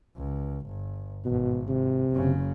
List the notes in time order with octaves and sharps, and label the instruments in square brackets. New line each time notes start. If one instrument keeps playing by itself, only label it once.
[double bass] C#2
G1
[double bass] G#1 [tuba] B2
[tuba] C3
[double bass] F#1 C#3